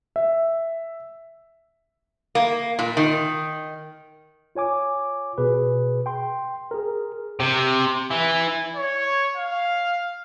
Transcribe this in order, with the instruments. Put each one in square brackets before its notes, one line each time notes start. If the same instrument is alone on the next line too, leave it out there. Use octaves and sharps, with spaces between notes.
[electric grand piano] E5
[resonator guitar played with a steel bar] A#3
A#2
D#3
[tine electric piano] F4 C#5 G#5 D6
B2 G#4 B4
G5 C6
G#4 A#4
[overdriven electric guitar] C3
E3
[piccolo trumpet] C#5
F5